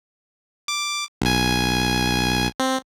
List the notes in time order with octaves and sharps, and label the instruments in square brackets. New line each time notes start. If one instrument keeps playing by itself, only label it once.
[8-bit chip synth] D6
B1 G#5
C4